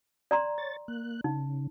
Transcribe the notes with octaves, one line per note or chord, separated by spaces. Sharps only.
D5 A#5 C6
C#5 A6
A#3 F#6
C#3 D#4